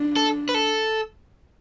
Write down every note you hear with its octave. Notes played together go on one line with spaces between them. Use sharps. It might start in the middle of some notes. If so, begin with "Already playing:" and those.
Already playing: D4
A4
B4
A4